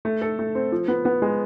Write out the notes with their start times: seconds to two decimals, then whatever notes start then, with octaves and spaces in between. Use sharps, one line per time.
0.05 A3
0.22 A4
0.39 A3
0.55 C4
0.72 F3
0.88 B3
1.05 B3
1.22 G#3